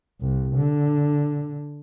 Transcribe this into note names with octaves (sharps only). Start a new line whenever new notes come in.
C2
D3